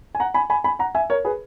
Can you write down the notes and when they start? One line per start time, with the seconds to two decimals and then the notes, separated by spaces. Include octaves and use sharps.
0.15 G#5
0.20 F#5 A#5
0.34 G#5 B5
0.50 G#5 B5
0.64 G#5 B5
0.79 F#5 A#5
0.95 E5 G#5
1.10 A#4 C#5
1.25 G#4 B4